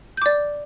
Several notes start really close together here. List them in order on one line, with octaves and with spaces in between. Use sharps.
G6 D6 D5